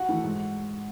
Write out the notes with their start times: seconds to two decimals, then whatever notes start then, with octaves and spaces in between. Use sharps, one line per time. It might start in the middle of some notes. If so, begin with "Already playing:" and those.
Already playing: F#4 F#5
0.09 E3 A3
0.24 G#2